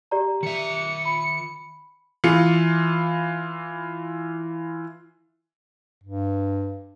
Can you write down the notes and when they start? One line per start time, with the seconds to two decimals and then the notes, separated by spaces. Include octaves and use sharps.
0.11 G4 D5 A#5
0.43 D#3 E5 C#7
1.05 B5
2.24 E3 F4 C#7
6.04 G2